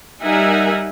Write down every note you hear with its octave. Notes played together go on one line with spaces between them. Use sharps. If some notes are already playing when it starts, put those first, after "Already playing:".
G3 D#4 A#4 E5 F#5 G#5